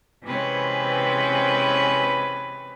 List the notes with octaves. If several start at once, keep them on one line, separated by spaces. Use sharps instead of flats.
C3 E3 G#3 C4 C#4 B4